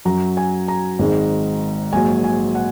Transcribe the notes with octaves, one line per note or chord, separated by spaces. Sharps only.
F#2 F#3 A#5
G#5
A#5
G#1 G#2 D#3 G#3
A#1 G#2 F#3 G#5
G#5
F#5